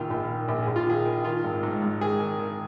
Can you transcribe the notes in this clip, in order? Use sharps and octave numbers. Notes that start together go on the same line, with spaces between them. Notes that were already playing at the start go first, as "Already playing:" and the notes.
Already playing: A#1 D#3 F4
A#1
D#3
A#1
A#1 G#4
F4
D#3 G#4
D#3
D#3 F4
G#1
G#2
G#2
D#3 G#4
D#3
D#3